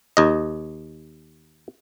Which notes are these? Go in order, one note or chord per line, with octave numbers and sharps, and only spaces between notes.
D#2 D#5